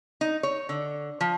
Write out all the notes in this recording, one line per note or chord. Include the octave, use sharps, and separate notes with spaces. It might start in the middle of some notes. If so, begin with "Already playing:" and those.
D#4
C#5
D3
F3